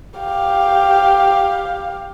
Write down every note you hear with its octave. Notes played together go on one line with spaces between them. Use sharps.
G4 F5